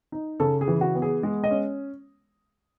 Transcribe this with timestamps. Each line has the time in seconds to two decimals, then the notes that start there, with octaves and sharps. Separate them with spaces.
0.12 D#4
0.40 C#3 A4
0.61 G#4
0.68 E3
0.81 F#4
0.95 B3
1.02 G#4
1.23 G#3
1.44 D#5
1.51 C#4